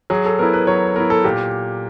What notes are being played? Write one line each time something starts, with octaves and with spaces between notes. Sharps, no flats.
F#3 G#4
A4
B3 E4 A#4
B4
F#3 C#5
B3 E4 A#4
A4
A#2 G4